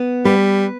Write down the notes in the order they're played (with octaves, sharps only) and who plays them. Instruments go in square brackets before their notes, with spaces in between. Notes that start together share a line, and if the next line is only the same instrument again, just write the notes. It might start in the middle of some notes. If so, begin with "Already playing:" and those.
Already playing: [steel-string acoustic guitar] B3
[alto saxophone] G3 [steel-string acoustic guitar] B4